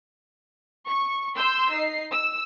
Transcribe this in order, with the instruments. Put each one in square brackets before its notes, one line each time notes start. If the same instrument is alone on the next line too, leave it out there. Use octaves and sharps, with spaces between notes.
[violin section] C#6
C6 E6 G6
D#4 C7
E6